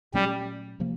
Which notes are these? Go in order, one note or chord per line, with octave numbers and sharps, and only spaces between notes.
A#2 F#3 G3 A3 C#4
C3 F3 A#3